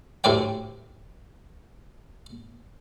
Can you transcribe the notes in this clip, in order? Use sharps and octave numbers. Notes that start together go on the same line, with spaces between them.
D2 A2 G4 D5 G5